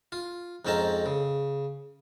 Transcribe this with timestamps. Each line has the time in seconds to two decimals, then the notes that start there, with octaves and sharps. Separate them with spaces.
0.12 F4
0.65 F2 G#2 C4 C#4 A5 A#5
1.06 C#3